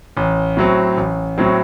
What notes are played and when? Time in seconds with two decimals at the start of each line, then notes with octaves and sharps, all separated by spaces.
0.17 A1
0.57 A2 F#3 C4
0.97 A1
1.38 A2 F#3 C4